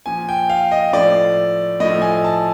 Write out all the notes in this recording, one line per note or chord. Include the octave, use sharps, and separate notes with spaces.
A#2 F3 G#5
G5
F5
D#5
A2 F3 D5
A2 F3 D#5
G#5
A5